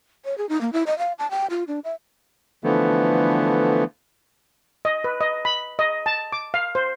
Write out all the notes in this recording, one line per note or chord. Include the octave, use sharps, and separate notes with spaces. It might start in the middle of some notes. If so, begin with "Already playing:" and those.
C#5
G#4
D#4
A#3
E4
D#5
F5
A5
G5
F4
D4
E5
D3 E3 F3 A3 B3
D#5
B4
D#5
B5
D#5
A5
D6
F5
C5